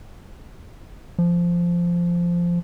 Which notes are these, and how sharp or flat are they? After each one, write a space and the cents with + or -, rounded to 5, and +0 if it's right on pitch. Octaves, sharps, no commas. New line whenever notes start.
F3 -10